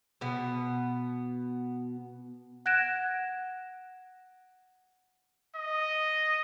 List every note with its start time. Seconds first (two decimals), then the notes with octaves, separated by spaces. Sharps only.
0.21 B2 B3
2.66 F#5 F#6 G#6 A#6 D7 E7
5.56 D#5